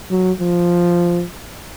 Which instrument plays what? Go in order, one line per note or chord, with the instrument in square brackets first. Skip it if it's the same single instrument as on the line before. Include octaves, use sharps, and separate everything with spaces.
[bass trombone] F#3
F3